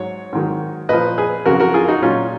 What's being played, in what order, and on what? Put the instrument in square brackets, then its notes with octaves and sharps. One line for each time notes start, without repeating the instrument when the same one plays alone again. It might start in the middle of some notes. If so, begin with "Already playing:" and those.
Already playing: [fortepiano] G#2 F#3 C#5
G#2 D#3 F#3
A#2 F3 B4 D#5
G#4 B4
F2 C#3 F#3 F#4 A#4
F#4 A#4
F4 G#4
D#4 F#4
A#2 F#3 C#4 F4